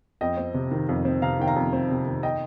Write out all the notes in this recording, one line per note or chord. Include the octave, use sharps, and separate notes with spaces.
F2 D#5 G5
C4
C3
D#3
F2
C4
C3 F5 A#5
D#3 G5
F5 A#5
F2
C4
C3
D#3
D#5 G5